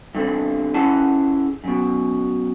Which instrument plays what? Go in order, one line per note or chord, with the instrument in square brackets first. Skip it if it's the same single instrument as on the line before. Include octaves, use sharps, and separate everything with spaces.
[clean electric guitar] G2 D3 C4
C#4 E4 G#4 F#5 A5
F#2 B2